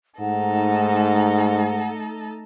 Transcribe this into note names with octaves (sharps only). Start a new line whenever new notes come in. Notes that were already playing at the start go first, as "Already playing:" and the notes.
G#2 A3 D#4 A4 F#5